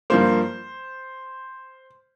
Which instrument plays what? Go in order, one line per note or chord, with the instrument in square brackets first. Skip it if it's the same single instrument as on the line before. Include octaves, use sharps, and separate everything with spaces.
[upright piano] G2 F3 A#3 C5